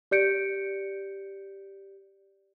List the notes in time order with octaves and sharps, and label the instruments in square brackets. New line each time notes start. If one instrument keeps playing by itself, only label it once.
[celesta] G4 D5 G6 C#7 D7